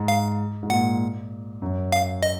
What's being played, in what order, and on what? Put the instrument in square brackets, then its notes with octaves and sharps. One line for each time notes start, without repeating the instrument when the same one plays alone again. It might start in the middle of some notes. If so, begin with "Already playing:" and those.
Already playing: [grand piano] G#2
[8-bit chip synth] F5
[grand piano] G#2
[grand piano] A#2 [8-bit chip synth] F#5
[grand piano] F#2
[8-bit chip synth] F5
D#5